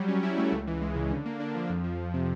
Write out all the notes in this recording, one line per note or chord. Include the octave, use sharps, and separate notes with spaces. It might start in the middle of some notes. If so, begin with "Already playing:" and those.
Already playing: F#3 G3
C#4
E4
A3
C#2
E3
G#3
C#3
D3
A#3
D4
F3
F2
F3
F2
C3